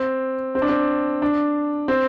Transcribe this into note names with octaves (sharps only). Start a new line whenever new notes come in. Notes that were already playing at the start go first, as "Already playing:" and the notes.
Already playing: C4
C4
D4
C4
D4
C4